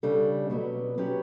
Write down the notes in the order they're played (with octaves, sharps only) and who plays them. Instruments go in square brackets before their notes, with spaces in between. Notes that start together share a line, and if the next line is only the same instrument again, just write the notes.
[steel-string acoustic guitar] C#3 G3 D4 A4
B2 F#3 B3
F#3 C#4 G4 B4